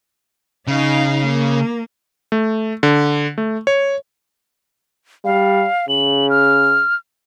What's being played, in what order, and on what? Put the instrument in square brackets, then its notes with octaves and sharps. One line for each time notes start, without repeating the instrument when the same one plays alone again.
[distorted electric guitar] C#3 [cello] D#4 F5
[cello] A#3
[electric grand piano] A3
D3
A3
C#5
[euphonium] G3 [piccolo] F5
[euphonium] C#3 [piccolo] F#7
[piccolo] F6